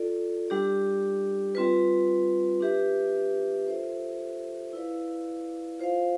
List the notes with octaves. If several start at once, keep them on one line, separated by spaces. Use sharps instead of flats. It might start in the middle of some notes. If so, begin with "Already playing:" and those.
Already playing: F4 A4 D5
G3 D4 G4 D5
G3 C4 F4 B4
D4 G4 B4 E5
F4 A4 C5 E5
E4 B4 D5 F5
F4 C5 F5